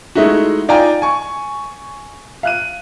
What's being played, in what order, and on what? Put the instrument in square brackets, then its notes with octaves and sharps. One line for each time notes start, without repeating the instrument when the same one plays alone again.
[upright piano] G#3 A3 D#4 E4 F#4
D#4 F4 D5 G5 G#5 A#5
G#5 C#6
F5 F#6 D#7